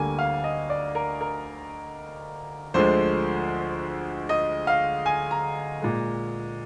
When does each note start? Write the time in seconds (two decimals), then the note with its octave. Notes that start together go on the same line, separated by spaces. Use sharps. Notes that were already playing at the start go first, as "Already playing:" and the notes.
Already playing: D2 D3 G3 A#3 G#5
0.19 F5
0.44 D#5
0.70 D5
0.95 A#4
1.21 A#4
2.74 D2 D3 F3 G#3 C5
4.29 D#5
4.67 F5
5.06 G#5
5.31 A#5
5.82 A#2 G#3